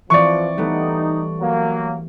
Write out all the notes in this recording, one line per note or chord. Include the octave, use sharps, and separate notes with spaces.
E3 F3 C4 D5 C#6
G3 A3 B3 D#4
F#3 A#3